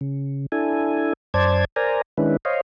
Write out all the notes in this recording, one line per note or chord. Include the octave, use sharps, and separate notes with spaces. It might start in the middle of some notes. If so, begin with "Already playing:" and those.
C#3
D4 E4 A4 G#5
F#2 C5 D5 A5 G#6
A#4 C5 D5 G#5 A#5
D#3 G#3 C#4 D4 E4 B4
C5 C#5 D#5 F5